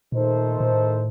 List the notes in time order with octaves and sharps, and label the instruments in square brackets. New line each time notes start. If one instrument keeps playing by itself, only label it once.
[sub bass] A#2 [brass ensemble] D#3 A3 D#4 A4 C5
[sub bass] A#2
A2